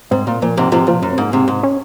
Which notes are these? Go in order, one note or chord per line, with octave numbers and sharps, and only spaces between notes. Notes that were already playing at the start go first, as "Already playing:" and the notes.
G#2 C4
A#2
A#2 F3
G#2 C3
G#2 C3 F3
A#2 F3
F#2 C#4
C4
G#2 A#3
G#2 C3 C4
G#2
C#4